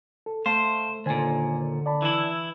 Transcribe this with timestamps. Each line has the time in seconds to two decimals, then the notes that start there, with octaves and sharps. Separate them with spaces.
0.26 A4
0.46 A3 C5 F5 A5 C6
1.06 D#2 A#2 D3 C5 G#5
1.86 D5 A5 B5
2.02 E3 E4